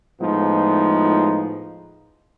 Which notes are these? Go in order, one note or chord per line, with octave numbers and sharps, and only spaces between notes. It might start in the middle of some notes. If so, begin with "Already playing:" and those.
A2 F3 G#3 B3 D#4 F4